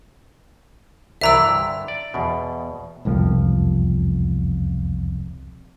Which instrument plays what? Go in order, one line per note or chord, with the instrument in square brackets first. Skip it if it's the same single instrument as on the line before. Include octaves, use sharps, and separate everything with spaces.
[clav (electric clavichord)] C2 E3 D5 [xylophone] E5 A#5 E6
[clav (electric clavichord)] G2 D3
D5
E2 B2
[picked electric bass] E1 C2 F2 F3